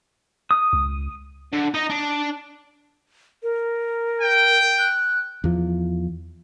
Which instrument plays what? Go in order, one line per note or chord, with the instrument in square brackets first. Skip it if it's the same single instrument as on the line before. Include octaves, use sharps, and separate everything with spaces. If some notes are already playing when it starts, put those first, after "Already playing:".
[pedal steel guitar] D#6
[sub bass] C#2
[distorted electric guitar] D3
D#4 D#5
D4
[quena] A#4
[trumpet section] G5
[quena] F#6
[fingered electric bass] E2 F3